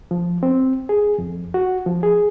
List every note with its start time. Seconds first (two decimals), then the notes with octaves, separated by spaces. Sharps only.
0.11 F3
0.43 C4
0.89 G#4
1.18 F2
1.54 F#4
1.86 F3
2.03 G#4